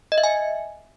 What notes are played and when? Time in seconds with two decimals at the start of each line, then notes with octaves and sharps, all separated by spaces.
0.12 D#5
0.18 E5
0.24 G#5